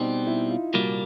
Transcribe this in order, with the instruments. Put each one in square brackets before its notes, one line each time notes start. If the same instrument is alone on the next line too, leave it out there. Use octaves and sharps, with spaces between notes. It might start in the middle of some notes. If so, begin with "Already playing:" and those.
Already playing: [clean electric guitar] B2 G3 C4 [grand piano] D#4
[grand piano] E4
F4
[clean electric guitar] C2 A#2 G3 A#3 [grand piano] F#4